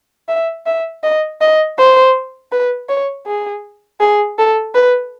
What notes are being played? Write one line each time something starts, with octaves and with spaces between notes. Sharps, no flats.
E5
E5
D#5
D#5
C5
B4
C#5
G#4
G#4
A4
B4